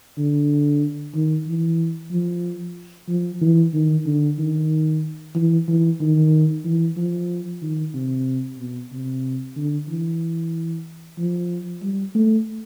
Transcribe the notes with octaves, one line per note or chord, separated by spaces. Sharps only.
D3
D#3
E3
F3
F3
E3
D#3
D3
D#3
E3
E3
D#3
E3
F3
D#3
C3
B2
C3
D3
E3
F3
G3
A3